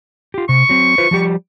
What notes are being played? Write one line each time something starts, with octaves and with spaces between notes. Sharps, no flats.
F4 G4
C3 C#6
F#3 C4
F4 B4 C5
F3 G3 G4